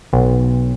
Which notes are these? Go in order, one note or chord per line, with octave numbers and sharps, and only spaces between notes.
B1